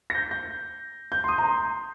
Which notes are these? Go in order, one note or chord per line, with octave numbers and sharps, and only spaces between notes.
A#6
G6
G6
G6
C6
D#6
A#5
C6